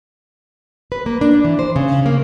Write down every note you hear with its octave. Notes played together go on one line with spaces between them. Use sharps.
B4
A#3
D4
E3
C5
C#3
A#3